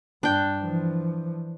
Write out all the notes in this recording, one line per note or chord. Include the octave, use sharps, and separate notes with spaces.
G2 D4 G5
E3 F3